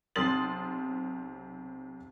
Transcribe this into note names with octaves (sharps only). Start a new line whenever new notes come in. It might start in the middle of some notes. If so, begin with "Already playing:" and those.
B1 C3 C6 D#6 A6 F#7